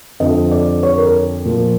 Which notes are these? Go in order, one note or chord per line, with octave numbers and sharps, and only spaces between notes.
F2 D3 F3 D#5
D5
C#5
A#4
A#2 F3